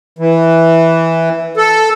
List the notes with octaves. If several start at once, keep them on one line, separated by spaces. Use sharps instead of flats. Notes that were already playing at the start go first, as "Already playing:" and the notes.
E3
A4